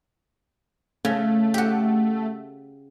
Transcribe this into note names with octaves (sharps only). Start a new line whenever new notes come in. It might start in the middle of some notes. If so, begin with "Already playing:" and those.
C#3 A3
F#4 G4